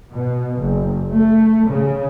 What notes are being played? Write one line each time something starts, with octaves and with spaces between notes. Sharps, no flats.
B2
F#1
A3
C#3